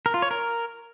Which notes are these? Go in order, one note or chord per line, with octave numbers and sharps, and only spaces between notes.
A#4
F4
C#5
A#4